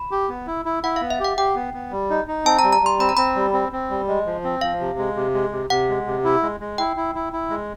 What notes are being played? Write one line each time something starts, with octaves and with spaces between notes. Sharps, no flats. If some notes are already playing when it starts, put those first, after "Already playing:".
Already playing: B5
G4
B3
E4
E4
E4 F#5
F5
B3
E5
G4 F#5
G4 G5
B3
B3
G3
D#4
D#4
C4 A5
A#5
G3
A#5
G3 C6
C4 B5
A#5
C4 B5
G3
C4
C4
G3
G#3
F3
C4
F3 F5
C3
G#3
C3
G#3
C3
C3 F#5
G#3
C3
E4
G#3
G#3
E4 G5
E4
E4
E4
G#3